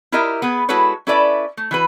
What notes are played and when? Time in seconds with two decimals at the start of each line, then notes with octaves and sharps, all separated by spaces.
0.12 E4 F4 G4 A#4 D#5 E5
0.42 B3 G#4 B4
0.69 G#3 E4 F#4 A4 B4 C#5
1.07 C#4 E4 A4 B4 D5 E5
1.57 A3
1.71 E3 F#4 B4